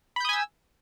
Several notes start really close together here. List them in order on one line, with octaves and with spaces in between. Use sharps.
B5 G6 D#6 G#5 E6